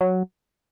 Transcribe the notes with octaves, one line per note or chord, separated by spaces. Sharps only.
F#3